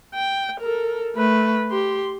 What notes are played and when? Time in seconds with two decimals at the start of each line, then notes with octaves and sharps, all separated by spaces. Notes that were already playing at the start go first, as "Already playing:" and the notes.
0.14 G5
0.60 A4 A#4
1.16 A3 B4
1.71 G4 C6